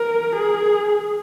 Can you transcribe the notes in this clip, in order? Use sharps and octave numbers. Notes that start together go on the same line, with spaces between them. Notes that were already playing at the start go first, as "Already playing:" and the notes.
Already playing: A#4
G#4